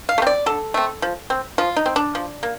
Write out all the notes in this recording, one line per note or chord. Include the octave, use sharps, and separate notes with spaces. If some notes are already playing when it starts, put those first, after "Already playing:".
F5
A3
C4 D5
D3 A4
A3 C4
F3
C4
F3 F4
D#4
C4
D4
F3
A#3